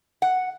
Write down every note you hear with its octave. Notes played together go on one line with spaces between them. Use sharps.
F#5